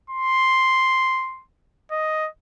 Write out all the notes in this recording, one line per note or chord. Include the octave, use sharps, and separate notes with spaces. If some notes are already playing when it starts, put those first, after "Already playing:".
C6
D#5